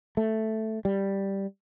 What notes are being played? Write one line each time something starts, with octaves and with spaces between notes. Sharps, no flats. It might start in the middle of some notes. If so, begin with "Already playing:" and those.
A3
G3